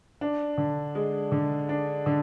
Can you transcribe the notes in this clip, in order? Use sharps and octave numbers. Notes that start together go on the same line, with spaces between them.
D4
D3
G#3
D3
D4
D3